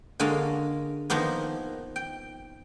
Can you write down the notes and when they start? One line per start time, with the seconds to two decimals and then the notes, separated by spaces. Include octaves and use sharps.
0.20 D3 G#3 A#3 C#5 D#5 F5
1.10 D#3 F3 A#3 B3
1.96 G5